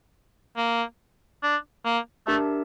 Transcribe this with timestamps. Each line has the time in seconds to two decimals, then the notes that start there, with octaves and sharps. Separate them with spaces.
0.57 A#3
1.43 D4
1.85 A#3
2.27 A3 D4 G4 A#4 E5 A5